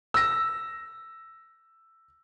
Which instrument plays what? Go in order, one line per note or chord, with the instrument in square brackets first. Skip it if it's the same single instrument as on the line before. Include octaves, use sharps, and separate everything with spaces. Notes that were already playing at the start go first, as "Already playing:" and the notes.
[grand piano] E6 A#6